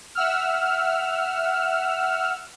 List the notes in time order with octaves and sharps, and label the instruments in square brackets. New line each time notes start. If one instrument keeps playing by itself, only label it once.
[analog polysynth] E5 F#5 E6 F6